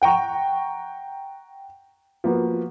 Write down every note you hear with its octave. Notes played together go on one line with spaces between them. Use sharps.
F#5 G5 A#5 C#6
F3 A#3 B3 F#4